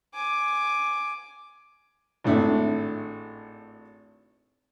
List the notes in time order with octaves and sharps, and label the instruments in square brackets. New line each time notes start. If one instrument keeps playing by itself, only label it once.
[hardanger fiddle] G#5 D6
[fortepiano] G#1 A2 D4 E5